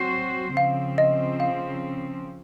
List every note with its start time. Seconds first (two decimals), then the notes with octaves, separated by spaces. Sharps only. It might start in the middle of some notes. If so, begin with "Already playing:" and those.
Already playing: F#3 C4 F#4 C5
0.57 C#3 F3 C4 F5
0.98 D#5
1.40 F5